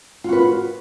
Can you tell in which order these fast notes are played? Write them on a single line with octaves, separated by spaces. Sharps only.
F4 F#4 B4